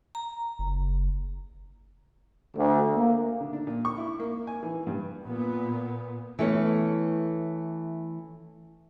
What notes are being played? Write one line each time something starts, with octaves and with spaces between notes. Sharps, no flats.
A#5
F#1
D2
A#3
D3
D4
A#2
C#6
E4
A#3
G#5
E3
G2
A#2 B3
E3 A3 B3 C#4